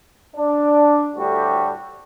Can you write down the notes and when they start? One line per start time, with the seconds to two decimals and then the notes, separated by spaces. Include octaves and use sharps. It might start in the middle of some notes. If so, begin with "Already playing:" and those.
0.35 D4
1.16 D2 A2 G3 F#4 G4 A4